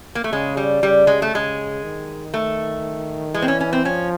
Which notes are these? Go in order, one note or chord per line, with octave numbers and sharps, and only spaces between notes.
A#3
A3
C#3 G#3
G3
C#3 G3
G#3
A3
C#3 G#3
D#3
A3
E3 G#3
C4
C#4
C#4
C4
F3 C#4